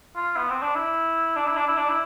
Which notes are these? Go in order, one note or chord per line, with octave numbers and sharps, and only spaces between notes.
F4
B3
C4
D4
E4
D4
E4
D4
E4
D4
E4